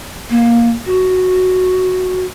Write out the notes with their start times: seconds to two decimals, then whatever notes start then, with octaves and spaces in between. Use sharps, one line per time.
0.30 A#3
0.86 F#4